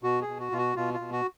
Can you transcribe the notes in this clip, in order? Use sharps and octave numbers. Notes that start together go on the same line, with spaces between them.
B2 F#4
G#4
B2
F#4
B2 F4
F#4
B2 F4
F4
B2
F#4